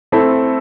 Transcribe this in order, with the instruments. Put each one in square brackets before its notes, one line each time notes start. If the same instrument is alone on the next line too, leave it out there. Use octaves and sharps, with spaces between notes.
[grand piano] A3 C4 E4 A4